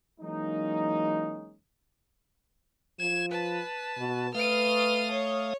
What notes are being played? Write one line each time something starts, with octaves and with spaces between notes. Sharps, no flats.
E3 F#3 G#3 A#3 C#4 D#4
F3 G#6 E7
B4 A5
B2
A3 B4 F5 D#6 F6 D#7
C#5